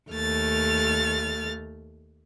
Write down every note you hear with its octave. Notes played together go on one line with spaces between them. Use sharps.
D#2 A3 F6 A6